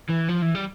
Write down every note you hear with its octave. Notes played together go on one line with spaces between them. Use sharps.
E3
F3
E3
G3